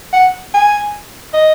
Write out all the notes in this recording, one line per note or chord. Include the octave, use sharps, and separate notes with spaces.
F#5
G#5
D#5